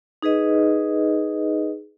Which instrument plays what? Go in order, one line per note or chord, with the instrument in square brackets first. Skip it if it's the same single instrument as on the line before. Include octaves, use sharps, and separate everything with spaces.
[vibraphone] D#4 G#4 B4 D#5